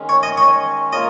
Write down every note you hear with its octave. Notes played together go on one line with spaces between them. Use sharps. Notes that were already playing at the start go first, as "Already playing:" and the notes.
Already playing: D#3 G#3 C#4
C#5
D#5
C#5
A#3 F4 A#4 C#5 D#5